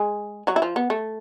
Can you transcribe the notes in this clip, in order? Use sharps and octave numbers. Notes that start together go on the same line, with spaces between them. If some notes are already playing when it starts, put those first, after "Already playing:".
Already playing: G#3 G#4
F#3 F#4
E4
F3 F4
B3
A3